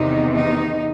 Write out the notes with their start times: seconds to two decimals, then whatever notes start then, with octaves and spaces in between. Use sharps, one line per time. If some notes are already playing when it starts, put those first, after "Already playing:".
Already playing: E2 C3 D#3 D#4
0.34 D#4